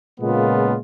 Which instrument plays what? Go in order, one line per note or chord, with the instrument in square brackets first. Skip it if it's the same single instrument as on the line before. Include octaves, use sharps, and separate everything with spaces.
[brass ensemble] A#2 C#3 G#3 A#3 B3 F4